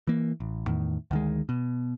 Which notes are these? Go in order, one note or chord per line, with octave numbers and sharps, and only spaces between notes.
E3 A#3
A1
E2 A2 D#3
D2 D#3 G#3
B2